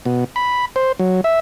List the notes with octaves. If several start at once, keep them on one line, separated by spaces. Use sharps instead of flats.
B2
B5
C5
F#3
E5